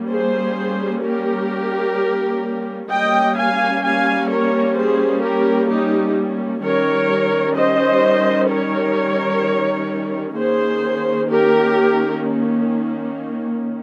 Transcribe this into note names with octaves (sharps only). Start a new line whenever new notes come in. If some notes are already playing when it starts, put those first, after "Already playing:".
Already playing: G3 A#3 C#4
G#4 C5
G4 A#4
G3 A#3 C#4 D#5 G5
F5 G#5
F5 G#5
A#4 C#5
G#4 C5
G4 A#4
D#4 G4
D#3 G3 C#4 A#4 C#5
C5 D#5
A#4 C#5
D#3 A#3 C#4 G#4 C5
G4 A#4